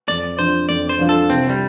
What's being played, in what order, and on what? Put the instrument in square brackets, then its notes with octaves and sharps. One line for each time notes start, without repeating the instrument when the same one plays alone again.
[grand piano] F2 [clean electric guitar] D5
[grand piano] F3 D4 F4 [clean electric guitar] C5
[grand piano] F2 [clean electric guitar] D5
[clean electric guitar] C5
[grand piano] F3 D4 F4
[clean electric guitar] A4
[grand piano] C2 [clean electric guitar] C4
[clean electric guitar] G3